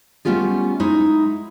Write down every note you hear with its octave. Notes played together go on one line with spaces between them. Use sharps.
G3 A3 B3 C#4 F4 G#4
G#3 D#4 E4